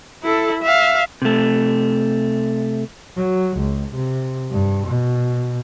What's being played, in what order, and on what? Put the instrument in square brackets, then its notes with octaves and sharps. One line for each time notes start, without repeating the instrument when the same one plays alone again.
[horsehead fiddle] E4 A4
E5 F5
[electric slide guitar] C3 A3
[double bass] F#3
C#2
C3
G2
B2